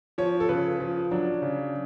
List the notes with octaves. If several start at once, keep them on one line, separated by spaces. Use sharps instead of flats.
F3 C#5
A4
C#3 B4
F3
F#3 D4
C#3